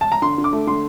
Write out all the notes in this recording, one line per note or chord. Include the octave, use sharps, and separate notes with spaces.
A5
A#5
D3 C6
D3
D6
A3
D3 C6